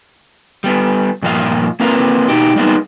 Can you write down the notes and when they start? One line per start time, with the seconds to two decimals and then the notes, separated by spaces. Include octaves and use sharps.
0.64 G3 B3
1.22 G2 A#2 F3 A#3 D#5 F5
1.80 A#3 C4 E4 A#4 B4 F5
2.28 B2 D#4 G4
2.56 G3 G#3 A#3 B3 D#4